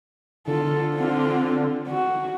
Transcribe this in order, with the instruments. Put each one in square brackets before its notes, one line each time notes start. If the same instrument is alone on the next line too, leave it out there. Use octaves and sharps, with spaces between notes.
[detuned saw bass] D3 [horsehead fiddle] F4 A4
[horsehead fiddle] C4 F4
F#4